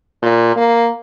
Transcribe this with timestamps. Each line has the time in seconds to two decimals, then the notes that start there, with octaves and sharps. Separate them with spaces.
0.22 A#2
0.56 A#3